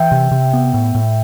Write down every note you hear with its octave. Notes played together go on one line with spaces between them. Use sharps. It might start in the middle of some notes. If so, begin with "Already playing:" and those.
Already playing: E3 E5 G5
C3
C3
B3
A2
A2